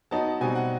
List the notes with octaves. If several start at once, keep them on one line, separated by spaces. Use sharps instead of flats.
F#3 B3 D#4 A5
B2 G3 C4 D#4 G#5
F#5